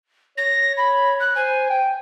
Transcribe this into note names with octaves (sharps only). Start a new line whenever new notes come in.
C#5 A#6
B5
F#6
C5 G#5
G5